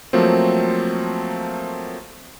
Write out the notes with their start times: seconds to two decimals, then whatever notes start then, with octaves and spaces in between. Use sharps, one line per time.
0.13 F3 F#3 A3 A#3 C4